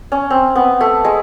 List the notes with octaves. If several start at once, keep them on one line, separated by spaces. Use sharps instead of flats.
C#4
C4
B3
A3
G#3